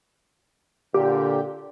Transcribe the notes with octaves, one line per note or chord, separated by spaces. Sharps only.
A#2 D3 G4